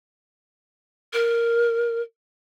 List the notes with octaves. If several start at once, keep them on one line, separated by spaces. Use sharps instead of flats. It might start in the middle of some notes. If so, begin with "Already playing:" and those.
A#4